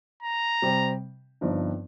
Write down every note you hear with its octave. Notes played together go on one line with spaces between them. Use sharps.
A#5
C3 G3 C4
G1 G2 F3 C4 D#4